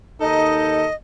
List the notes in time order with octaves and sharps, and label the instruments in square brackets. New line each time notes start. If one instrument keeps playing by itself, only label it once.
[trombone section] D#2 D#4 [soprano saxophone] A4 [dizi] D#5